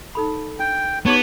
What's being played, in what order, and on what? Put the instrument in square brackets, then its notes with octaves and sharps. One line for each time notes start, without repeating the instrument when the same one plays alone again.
[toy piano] D#4 A4 B5
[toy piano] D4 [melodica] G5
[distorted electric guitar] B3 [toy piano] D#4 G4 D6 [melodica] C#5